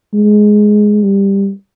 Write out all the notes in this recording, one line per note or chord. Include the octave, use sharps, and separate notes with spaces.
G#3
G3